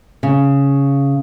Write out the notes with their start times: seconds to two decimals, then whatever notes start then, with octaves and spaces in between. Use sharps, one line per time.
0.23 C#3